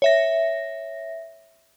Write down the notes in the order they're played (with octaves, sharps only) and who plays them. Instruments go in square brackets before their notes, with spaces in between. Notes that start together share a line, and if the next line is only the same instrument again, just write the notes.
[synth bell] C#5 E5 A#6